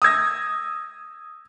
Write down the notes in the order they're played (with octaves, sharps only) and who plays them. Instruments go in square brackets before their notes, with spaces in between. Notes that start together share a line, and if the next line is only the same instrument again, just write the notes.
[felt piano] D#6 E6 G#6 A#6